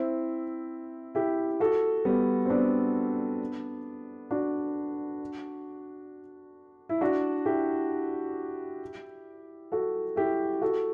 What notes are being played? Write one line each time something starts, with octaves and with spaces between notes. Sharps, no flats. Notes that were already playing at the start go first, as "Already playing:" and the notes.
Already playing: C4 E4
E4 G4
F#4 A4
G3 B3
C4
B3 D4
D4 F#4
E4
D4 F#4
E4 G4
F#4 A4
E4 G4
F#4 A4